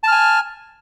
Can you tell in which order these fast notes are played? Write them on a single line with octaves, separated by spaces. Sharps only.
A5 F6 G#5